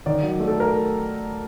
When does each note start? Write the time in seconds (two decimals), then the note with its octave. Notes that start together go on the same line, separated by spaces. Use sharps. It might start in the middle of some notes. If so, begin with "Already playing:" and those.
0.06 D#3 D5
0.22 F#3
0.40 A3
0.48 A4
0.60 A#4